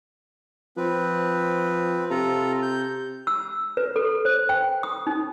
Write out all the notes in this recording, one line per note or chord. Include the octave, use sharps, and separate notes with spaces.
F3 C4 B4
C3 F4 A4 A#5
G6
E6
B4
A4
C5
G5
D#6
D#4